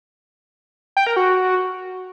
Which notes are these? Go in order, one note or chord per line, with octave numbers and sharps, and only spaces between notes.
G5
A#4
F#4